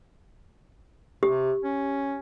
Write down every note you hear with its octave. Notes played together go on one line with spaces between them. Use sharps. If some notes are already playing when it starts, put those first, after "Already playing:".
C3 G4
C#4